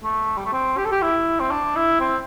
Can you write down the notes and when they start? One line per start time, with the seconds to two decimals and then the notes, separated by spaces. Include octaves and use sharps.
0.04 A3
0.37 G3
0.45 A3
0.53 C4
0.77 G4
0.85 A4
0.92 G4
1.02 E4
1.40 C4
1.51 D4
1.76 E4
2.00 C4